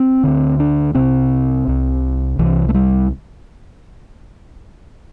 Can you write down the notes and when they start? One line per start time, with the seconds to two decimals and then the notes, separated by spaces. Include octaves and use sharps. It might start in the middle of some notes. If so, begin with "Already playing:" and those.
Already playing: C4
0.23 D2 D3
0.60 D4
0.95 C2 C3 C4
1.68 C2 C3
2.39 C2 C3 E3
2.69 A3
2.74 G3